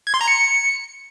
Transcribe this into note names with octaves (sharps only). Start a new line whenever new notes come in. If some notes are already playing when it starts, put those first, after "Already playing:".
G#6
C6
A#5
C#7